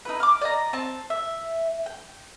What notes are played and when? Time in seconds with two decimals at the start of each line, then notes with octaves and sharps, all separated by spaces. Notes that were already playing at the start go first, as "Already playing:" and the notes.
0.05 D#4 E4 B4
0.20 D6 F6
0.41 D5 D#5 A#5
0.73 C4 A5
1.10 E5
1.86 G5